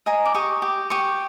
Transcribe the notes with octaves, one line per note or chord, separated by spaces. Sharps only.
D#5 G#5 A#5
D6
G4 C#6 D#6
G4
G4 C#6 D#6